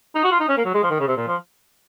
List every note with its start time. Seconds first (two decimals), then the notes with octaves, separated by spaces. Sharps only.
0.15 D#4
0.24 F#4
0.31 F4
0.40 D#4
0.48 C#4
0.57 A#3
0.65 F#3
0.74 G#3
0.83 F3
0.90 D#3
1.00 C#3
1.08 C3
1.17 A#2
1.27 F3